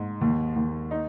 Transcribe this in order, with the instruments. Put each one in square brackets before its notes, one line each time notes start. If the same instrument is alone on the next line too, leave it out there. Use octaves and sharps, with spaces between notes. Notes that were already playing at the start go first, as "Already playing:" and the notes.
Already playing: [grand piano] G#2
D#2
D#2
D#4